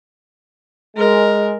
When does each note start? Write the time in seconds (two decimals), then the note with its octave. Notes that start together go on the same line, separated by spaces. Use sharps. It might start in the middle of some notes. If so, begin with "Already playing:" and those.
0.97 G#3 A#4